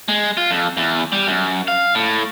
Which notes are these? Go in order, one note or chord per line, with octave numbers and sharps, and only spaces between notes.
G#3
F4
F2
E2
G3
F#2
F5
A2